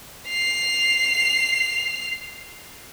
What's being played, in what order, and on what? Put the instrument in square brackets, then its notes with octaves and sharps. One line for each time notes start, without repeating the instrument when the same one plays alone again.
[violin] C7 F7